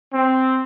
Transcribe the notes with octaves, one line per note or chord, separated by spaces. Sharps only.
C4